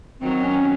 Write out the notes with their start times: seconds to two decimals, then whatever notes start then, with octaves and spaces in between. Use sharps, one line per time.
0.21 D#3 F#3 C4
0.44 C#4